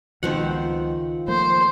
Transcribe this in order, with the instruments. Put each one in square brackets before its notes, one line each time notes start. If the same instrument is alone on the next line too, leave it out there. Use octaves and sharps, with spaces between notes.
[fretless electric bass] C#2 F3 G#3 [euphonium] B2 [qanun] D#3 C4 F#5
[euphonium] F4
[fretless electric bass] F3 A3 A#3 [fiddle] C5